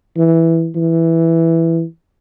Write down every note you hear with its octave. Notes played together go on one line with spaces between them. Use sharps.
E3
E3